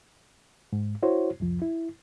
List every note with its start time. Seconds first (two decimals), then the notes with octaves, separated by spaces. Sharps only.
0.73 G#2
1.03 E4 F#4 C5 C#5
1.40 C2 F2 F3
1.62 E4